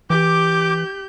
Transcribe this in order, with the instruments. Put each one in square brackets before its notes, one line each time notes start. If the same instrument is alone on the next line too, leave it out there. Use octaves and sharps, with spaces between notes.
[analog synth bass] E3 [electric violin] G4 G6 [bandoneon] D6